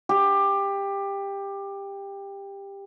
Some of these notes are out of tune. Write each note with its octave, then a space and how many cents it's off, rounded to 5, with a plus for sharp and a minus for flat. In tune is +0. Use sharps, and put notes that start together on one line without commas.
G4 +15